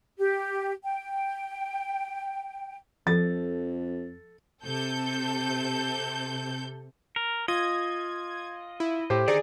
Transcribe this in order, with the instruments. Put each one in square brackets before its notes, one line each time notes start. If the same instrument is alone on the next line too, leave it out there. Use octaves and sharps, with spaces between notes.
[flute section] G4
G5
[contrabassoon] F2 [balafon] F3 [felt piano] A4 A6
[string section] C3 A4 G6
[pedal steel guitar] A#4
[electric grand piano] F4 [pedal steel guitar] D#5 [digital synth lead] G#6
[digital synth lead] E4
[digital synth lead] A2 [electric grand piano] G4 C5
[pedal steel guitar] D3 D#3 D#4 [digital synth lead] G#4 [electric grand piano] D5